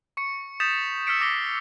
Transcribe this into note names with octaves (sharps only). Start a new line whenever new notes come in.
C#6 C#7
D#6 G6 A6 B6 E7 F7
E6 F6 G6 B6 C#7 D7
D6 E6 A#6 C7 E7 G7